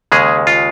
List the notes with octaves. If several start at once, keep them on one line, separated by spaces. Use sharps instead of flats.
D#2 C#3 G#3 G#4
F4